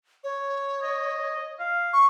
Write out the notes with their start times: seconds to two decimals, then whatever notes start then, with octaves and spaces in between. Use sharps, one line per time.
0.24 C#5
0.81 D#5
1.59 F5
1.93 C#6